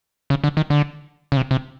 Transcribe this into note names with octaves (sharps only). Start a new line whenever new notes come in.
C#3
D3
D#3
D3
C#3
C3
C3